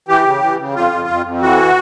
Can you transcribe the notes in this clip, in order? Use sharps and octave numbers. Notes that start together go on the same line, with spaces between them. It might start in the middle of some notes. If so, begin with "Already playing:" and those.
E3 G4
C#3
E3
C#3
F2 F4
F2
F2
F2
E3 F#4